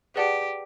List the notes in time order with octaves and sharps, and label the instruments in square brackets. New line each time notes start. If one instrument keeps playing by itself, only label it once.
[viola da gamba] G4 [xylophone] G#4 B4 D5 F#5 A5